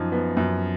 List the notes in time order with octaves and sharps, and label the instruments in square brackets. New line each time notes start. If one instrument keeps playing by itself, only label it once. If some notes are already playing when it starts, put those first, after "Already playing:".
Already playing: [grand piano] F#2 F3 D#4
B3
F#2